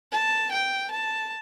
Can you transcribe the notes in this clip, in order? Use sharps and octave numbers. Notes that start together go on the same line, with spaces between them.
A5
G5
A5